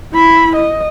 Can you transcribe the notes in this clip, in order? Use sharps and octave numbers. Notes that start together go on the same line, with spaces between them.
E4 B5
D#5